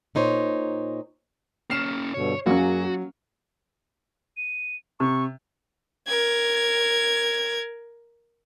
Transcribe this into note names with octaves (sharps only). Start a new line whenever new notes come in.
A#2 D#4 C5 C#5
A#3 C#4 F6 C7 E7
G2 B2 D3 C#5
F#2 F#3 A#3 C#4 F#4 G#4
D#7
C3 C#6
A#4 G#6